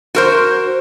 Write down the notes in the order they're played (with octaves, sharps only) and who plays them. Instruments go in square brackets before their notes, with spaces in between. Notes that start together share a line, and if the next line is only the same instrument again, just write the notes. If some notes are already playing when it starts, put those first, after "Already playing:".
[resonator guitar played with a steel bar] F#4 A#4 C5